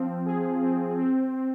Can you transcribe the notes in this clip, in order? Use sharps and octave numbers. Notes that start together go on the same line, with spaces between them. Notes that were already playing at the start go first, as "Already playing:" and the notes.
Already playing: F3 C4
G#4
C4
C4
C4